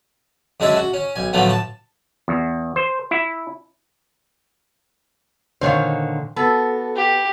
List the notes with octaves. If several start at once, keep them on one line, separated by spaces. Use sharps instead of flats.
F#2 G#3 D4 G#4 E5 A5
F#4
C#4
B1 G#5
A2 D3 F3 F#3 A3 B3
A5
E2
C5
E4
A#2 D3 D#3 C5 C#5 F5
B3 F#4 A4
G4